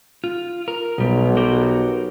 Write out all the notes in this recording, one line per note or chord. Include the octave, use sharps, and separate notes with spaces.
F4
A#4
B1 B2 G3
F#4 G4 A#4